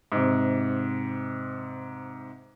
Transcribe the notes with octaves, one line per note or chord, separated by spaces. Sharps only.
G#2 C3